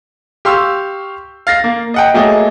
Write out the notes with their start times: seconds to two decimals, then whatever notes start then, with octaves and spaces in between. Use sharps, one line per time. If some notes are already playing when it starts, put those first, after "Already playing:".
0.45 G4 F5 C6 C#6 E6
1.47 F5 A6 A#6 C7
1.64 A#3
1.94 D#5 F#5 G5
2.14 F#3 A3 A#3 G#4 D#5